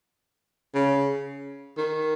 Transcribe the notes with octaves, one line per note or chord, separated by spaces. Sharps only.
C#3
D#3